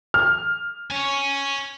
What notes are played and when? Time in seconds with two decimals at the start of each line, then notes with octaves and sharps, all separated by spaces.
0.14 F6
0.91 C#5 G#5